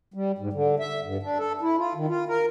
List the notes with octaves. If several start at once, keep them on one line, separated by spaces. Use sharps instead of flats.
G3
G#2
D3
E5
G2
D4
A4
E4
F4
D#3
F4
A#4